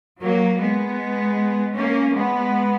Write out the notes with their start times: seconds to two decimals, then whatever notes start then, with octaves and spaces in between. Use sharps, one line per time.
0.20 F#3 A#3
0.58 G#3 B3
1.75 A#3 C#4
2.14 G#3 B3